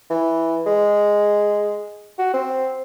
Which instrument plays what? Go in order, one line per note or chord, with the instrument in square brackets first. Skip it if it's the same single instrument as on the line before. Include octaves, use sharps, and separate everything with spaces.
[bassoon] E3
G#3
F#4
C4